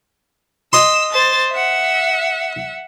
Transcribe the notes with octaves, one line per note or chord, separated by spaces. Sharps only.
D#5 C6 E6
C5 A6
E5 F#5